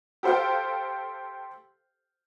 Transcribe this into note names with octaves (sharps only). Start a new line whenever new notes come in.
G4 A4 C5 F5 G5